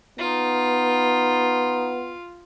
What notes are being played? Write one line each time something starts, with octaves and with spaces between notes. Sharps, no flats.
B3 D#4 F4